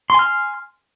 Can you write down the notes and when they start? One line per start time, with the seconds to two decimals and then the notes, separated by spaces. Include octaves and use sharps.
0.10 C6
0.14 G#5
0.19 F6